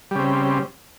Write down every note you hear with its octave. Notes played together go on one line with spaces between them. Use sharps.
C#3 G3 C4